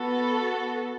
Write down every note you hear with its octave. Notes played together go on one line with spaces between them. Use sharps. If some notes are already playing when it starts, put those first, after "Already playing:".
Already playing: B3 F#4 A4